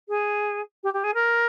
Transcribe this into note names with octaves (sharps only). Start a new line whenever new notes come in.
G#4
G4
G4
G#4
A#4